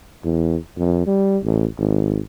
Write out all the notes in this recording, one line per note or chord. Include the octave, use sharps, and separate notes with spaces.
E2
F2
G3
A1
G#1